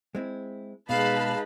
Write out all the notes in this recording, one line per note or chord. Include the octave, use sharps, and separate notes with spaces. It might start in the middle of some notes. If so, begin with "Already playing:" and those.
G#3 C4 E4
B2 G#3 D#4 B4 F5 A5 B5